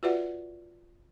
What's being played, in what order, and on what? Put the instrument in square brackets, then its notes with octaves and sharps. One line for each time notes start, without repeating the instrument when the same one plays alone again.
[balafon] F4 F#4 B4 D5 E5 F#5